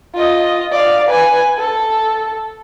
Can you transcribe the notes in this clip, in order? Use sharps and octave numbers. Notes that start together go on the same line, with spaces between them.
F4 D#5
D5 F5
B4 G#5
A4